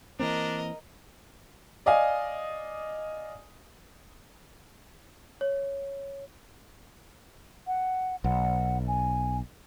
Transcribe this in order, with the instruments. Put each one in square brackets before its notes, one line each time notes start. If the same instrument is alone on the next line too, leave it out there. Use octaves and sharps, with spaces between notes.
[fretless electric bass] E3 A#3 C4 [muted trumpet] D4 [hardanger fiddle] A#4 D#5
[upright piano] D5 D#5 F5 G#5
[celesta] C#5
[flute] F#5
[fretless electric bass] B1 [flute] F#5
[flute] G#5